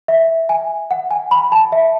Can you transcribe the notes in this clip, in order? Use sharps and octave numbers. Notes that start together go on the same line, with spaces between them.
E5
G#5
F#5
G#5
B5
A5
E5